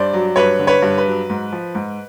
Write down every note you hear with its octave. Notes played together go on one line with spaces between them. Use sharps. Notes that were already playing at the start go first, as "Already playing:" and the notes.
Already playing: G2 C5 D5
F#3
G2 B4 C#5
D3
B4 C#5
G2
B4
F#3
G#2
F3
G#2